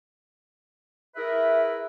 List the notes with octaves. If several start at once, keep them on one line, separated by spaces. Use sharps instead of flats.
E4 G#4 A#4 B4 E5